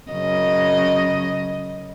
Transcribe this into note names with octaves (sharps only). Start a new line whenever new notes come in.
F#2 C#3 D#5